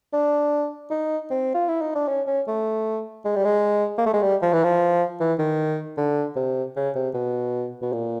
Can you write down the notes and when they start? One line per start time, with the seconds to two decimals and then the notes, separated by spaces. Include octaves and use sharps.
0.13 D4
0.91 D#4
1.30 C4
1.54 F4
1.69 E4
1.82 D#4
1.95 D4
2.08 C#4
2.27 C#4
2.48 A3
3.25 G#3
3.36 G3
3.45 G#3
3.98 A#3
4.06 A3
4.14 G#3
4.22 G3
4.42 F3
4.53 E3
4.64 F3
5.20 E3
5.39 D#3
5.97 D3
6.36 C3
6.76 C#3
6.96 C3
7.14 B2
7.82 B2
7.93 A#2